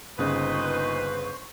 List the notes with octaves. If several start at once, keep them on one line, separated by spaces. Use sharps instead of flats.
G1 A#2 C#3 D#4 B4 C5 C#6